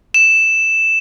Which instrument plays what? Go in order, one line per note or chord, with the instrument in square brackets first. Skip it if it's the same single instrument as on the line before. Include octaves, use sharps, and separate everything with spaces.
[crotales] E7